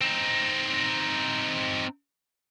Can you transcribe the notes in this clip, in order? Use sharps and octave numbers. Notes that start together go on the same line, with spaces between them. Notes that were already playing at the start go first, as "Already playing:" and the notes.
C4 D#4